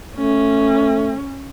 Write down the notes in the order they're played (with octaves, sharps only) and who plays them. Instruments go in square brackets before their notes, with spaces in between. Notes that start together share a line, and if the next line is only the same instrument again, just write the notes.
[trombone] A3 [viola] C#4